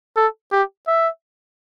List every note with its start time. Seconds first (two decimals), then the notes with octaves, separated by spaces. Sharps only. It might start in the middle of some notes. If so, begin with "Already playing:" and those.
0.16 A4
0.52 G4
0.87 E5